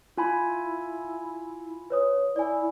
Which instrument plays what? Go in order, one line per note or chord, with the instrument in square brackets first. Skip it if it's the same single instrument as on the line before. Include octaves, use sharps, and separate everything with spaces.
[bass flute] E4 [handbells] F4 G#5 B5
[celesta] B4 C#5 D#6
[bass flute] E4 [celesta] D5 G#5